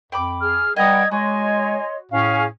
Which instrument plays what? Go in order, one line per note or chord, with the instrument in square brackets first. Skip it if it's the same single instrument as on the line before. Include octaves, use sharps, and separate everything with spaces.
[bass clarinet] F2 [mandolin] G5 B5 D6
[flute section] G#4 [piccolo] F6
[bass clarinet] G3 [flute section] B4 F#5 G5 [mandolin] D#5 A#5 D#6 [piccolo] G#6
[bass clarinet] G#3 [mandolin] F#4 [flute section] C#5 D#5 C6 [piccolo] G#5
[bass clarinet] A2 [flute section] C#4 G#4 C#6 [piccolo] F5